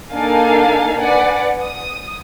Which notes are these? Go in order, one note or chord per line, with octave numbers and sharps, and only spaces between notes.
A#3 D4 D#4 A4 F5 G#5
B4 D5 F#5 G#5
D#6